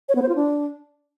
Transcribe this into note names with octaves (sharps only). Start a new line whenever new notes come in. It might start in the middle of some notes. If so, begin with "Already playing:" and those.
C#5
B3
C5
F4
D4